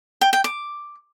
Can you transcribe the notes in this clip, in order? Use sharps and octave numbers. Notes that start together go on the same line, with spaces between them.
G5
G5
D6